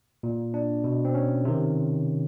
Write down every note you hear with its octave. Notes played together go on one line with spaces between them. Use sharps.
A#2
D4
B2
C4
C#4
C3 D#3